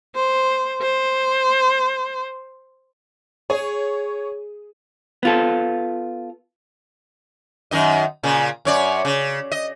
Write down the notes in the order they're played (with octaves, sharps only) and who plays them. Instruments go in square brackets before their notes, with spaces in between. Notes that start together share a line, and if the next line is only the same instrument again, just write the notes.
[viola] C5
C5
[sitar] G#4 [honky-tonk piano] C#5
[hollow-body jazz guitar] B3 F4 A4
[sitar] F#2 D#3 D#5
A#2 C#3
F#2 C#5 D5
C#3
D#5